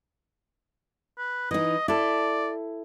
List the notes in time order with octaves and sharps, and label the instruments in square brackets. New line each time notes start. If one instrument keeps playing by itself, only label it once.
[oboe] B4
[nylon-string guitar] E3 D#4 [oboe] D#5
[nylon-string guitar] E4 A4 [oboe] D5